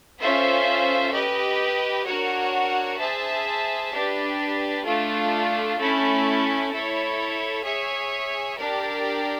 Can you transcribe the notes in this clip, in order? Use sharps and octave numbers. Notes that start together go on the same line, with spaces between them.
C#4 F4 A4 C5 E5
G4 B4 D#5
D4 F#4 A#4 C#5 F#5
G#4 C5 E5 A5
D4 G4 B4
A3 D4 F4
A3 C#4 E4
E4 A4 C#5
G#4 C#5 E5 G#5
D4 G4 A#4 D5 G5